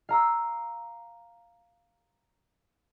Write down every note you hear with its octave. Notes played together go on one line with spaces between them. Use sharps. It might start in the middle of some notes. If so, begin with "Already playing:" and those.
F5 A#5 E6